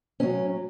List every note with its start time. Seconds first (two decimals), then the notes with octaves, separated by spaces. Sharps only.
0.20 A2 F#3 C#4